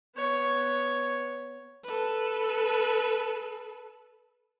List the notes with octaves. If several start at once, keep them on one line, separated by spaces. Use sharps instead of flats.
B3 C#5
A4 B4